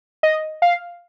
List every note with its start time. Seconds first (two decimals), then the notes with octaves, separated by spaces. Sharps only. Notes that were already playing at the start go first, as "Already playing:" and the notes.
0.23 D#5
0.62 F5